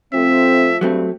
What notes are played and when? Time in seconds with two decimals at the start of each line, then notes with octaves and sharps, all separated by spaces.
0.13 F3 A3 C4 E5
0.81 G2 F#3 A3 C4